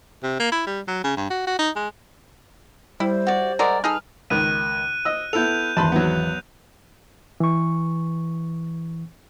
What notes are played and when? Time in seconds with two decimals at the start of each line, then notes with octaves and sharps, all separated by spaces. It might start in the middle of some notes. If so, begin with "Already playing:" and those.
0.23 C3
0.40 A#3
0.52 E4
0.66 G3
0.88 F#3
1.04 C#3
1.17 G2
1.30 F#4
1.47 F#4
1.59 D#4
1.76 G#3
3.00 G3 E4 C5
3.27 F#4 D5
3.59 G#3 A#4 D5 E5 F#5
3.84 D#4 G#4 A4 B4 F6
4.30 C#2 D#3 F#6 D#7
5.05 D#5 E6
5.33 B3 E4 A4 G6 F7
5.77 G#1 E2 A5 B5 C6
5.92 F#3 B3
7.40 E3 C#6